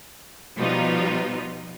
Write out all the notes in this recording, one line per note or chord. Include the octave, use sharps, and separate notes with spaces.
B2 F3 G3 B3 D#4 F4